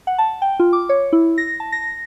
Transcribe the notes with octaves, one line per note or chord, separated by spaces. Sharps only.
F#5
A5
G5
F4
D6
C#5
E4
A#6
A5
A#6